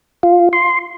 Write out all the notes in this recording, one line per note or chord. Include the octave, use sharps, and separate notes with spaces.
F4
C6